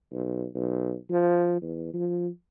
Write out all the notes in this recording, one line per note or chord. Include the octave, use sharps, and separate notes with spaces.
B1
B1
F3
E2
F3